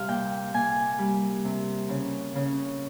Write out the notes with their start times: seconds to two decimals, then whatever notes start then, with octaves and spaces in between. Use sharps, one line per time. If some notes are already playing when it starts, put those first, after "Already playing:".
Already playing: C3 G3 F5
0.08 A#2 G5
0.54 A#2 G#5
0.99 G3
1.44 C3
1.89 C#3
2.35 C#3